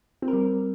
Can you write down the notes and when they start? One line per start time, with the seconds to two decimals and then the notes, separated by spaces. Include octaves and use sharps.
0.22 C4
0.28 A#4
0.33 G3